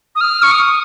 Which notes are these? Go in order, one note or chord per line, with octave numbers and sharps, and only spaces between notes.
D#6
F6
C#6
D#6